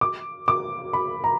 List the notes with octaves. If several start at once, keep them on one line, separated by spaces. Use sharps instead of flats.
D6
D6
B5
A#5